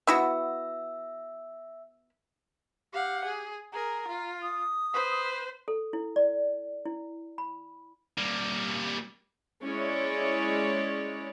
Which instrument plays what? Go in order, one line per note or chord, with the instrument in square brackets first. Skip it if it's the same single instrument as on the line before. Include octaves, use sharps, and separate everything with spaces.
[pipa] B3 E4 F#4 [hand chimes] E5 E6
[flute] G4 [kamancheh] F5 F#5
[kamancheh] G#4
[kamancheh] G#4 A#4 [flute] A#5
[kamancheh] F4
[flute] D#6
[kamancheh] B4 C5
[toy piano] A4
E4
D5
E4
B5
[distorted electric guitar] G3 A#3
[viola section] G#3 C#4 E4 C#5 D5